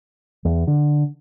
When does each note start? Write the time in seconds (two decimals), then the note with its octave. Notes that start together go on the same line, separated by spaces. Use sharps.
0.45 E2
0.67 D3